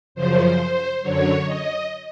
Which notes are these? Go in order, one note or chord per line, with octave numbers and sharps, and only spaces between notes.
F#2 C#3 F3 C5
F#2 D3 F#3 C#5
D#5